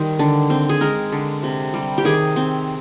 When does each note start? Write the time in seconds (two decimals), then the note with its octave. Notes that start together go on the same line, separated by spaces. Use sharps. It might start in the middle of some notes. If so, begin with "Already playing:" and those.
Already playing: D#3 G3 C5
0.19 D3
0.50 C4
0.69 G#4
0.81 G#3 A#4
1.12 D3
1.43 C3
1.74 G3
1.98 G4
2.05 D#3 G#4
2.36 C4